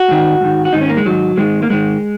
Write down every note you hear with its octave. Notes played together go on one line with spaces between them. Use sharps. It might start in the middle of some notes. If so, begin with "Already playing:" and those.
Already playing: F#4
G#2 D#3
G#2 D#3
F#4
G#2 D#3 D#4
C#4
A#3
G#3
G#2 D#3 F#3
G#2 D#3 G#3
A#3
G#2 D#3 G#3